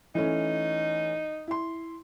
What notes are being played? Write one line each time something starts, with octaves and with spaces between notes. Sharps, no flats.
E3 A3 C#4 D#4
E4 C6